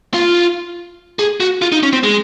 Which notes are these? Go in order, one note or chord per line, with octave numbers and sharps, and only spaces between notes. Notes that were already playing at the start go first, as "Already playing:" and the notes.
F4
G#4
F#4
F4
D#4
C#4
C4
G#3